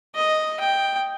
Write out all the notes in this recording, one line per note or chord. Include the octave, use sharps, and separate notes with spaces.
D#5
G5